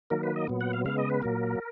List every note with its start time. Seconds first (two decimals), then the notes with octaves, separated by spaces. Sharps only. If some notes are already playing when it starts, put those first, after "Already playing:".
0.10 D#3 F#3 A#3 A#4
0.23 B4
0.36 D#5
0.47 A#2 F#3 B3
0.61 F#5
0.73 F5
0.85 C#3 G#3 B3 F5
0.98 D#5
1.10 B4
1.22 A#2 F#3 A#3 A#4